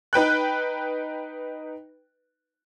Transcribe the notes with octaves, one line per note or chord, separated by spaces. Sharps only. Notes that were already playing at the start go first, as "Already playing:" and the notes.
D#4 B4 G5 F#6